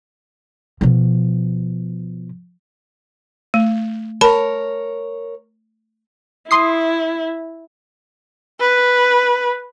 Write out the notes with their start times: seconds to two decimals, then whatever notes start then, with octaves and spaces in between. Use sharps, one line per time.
0.81 B2 F3
3.54 A3
4.21 A#4 C#5 A5 B5
6.51 E4 C6 D#6 C7
8.60 B4